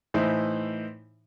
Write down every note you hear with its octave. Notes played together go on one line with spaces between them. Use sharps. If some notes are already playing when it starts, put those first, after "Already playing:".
A2 E3 D#4 C5 C6